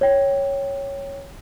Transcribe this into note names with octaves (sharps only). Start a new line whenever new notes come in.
C#5 G5